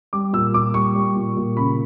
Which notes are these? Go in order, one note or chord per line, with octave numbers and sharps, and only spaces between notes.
G3 D6
A#2 E6
A#2 D6
G3 C#6
G3
A#2
A#2
C#3 B5